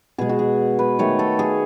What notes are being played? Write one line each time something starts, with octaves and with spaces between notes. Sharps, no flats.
B2 G#3 G#4
F#4
G#4
B4
D#3 A3 C#5
A4
G#4